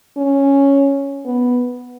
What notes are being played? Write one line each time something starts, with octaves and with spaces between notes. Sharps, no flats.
C#4
B3